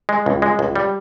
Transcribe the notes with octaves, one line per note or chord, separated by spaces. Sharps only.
G#3
C#2
G#3
C#2
G3